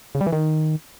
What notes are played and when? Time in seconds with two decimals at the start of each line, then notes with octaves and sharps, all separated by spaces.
0.15 C#3
0.21 G3
0.27 E3
0.32 D#3